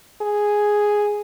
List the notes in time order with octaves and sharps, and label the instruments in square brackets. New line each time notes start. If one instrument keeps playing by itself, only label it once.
[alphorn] G#4